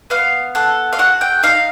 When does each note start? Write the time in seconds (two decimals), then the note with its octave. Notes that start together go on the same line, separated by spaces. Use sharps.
0.10 B3 F5
0.55 A4 F#5
0.93 F5
0.99 F#4 F#5
1.21 G5
1.43 D#4 F5